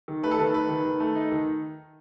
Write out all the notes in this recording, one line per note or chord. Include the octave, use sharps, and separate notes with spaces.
D#3
A3 B4
A4
D#3 B4
A3 B4
D#3
D#3
A3
D#4
D#3